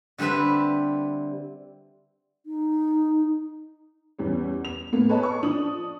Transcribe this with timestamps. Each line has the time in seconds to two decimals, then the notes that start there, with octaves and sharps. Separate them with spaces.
0.18 D3 G3 C4 B4 E5
2.46 D#4
4.19 E2 G3 C#4
4.65 F7
4.92 A2 A#3 B3
5.09 A4 B4 C#5 D#5 A5
5.23 C#6
5.43 F3 D4 D#6 F#7